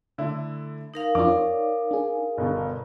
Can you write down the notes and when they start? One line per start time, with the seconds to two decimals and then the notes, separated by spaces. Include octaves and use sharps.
0.18 D3 A3 E4
0.94 D#4 A#4 F5
1.15 F2 D4 F4 D6
1.28 C#5 D5
1.91 D4 G#4
2.38 G1 B2